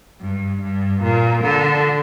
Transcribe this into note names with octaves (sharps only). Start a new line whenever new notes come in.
G2
G2
A#2
D3